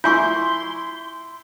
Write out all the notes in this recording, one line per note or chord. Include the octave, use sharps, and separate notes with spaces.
E4 F4 G#5 C6 C#6 G6